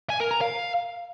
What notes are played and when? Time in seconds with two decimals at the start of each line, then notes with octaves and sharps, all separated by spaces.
0.10 G#5
0.20 A#4
0.31 A#5
0.41 F5